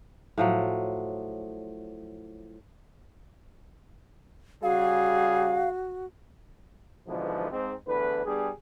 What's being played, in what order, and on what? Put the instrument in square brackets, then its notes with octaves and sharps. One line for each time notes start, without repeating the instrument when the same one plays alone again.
[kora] A2 F3 F#3
[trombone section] C#3 G3 G#4 [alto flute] F#4 [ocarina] F5
[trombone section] B1 G#2 B2 D3 E3 F3
G#2 C4
E2 A2 D3 B4
G3 B3 D4 G#4